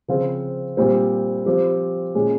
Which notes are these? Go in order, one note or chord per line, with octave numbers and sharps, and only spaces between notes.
C#3 F3 C4 F4
A#2 G3 C4
F3 C4 G4
A#2 G#3 C#4